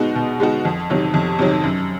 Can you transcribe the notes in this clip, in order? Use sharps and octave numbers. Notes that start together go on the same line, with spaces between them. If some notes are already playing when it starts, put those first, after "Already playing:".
Already playing: B2 G#3 B3 D#4 F#4
B2
G#3 B3 D#4 F#4
F2
C3 D#3 F#3
F2
C3 D#3 F#3
F#2